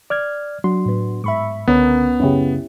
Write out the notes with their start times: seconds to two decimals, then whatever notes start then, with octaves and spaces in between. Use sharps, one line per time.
0.10 D5 F6 G#6
0.64 F#3 D4 F#4 C6
0.86 A2 B3
1.24 G#2 E5 B5 C#6
1.68 C#2 D3 B3 C#4 A#4
2.20 F#2 C#3 C#4 E4 G4